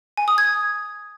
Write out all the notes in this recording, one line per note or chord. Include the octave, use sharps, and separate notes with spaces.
G#5
D#6
G#6